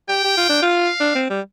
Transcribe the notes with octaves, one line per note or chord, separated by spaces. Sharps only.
G4 G5
G4
F4
D4
F4
F5
D4
C4
G3